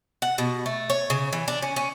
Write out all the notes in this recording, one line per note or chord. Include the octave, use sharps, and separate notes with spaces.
F#5
B2
A3
C#5
C#3
E3
D4
C#4
C#4